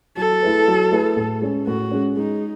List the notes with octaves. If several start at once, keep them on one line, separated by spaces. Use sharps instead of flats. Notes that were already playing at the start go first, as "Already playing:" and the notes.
F#3 A4
A3 E4 G#4 B4
F#3
A3 E4 G#4 B4
A2
G#3 C#4
A2 F#4
G#3 C#4
G#3 D#4